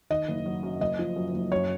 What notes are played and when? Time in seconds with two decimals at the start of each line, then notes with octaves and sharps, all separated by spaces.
0.10 D#3 D#5
0.28 F#1
0.46 F#3
0.63 F#2
0.80 F#1 D#5
0.99 F3
1.16 F#2
1.34 F#1
1.52 F#2 C#5